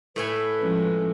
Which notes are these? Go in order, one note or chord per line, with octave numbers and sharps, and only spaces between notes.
A2 A3 B4 G#5
F3 G#3 C#4